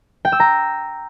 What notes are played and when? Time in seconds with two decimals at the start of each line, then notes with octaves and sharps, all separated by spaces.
0.25 G5
0.32 E6
0.40 A#5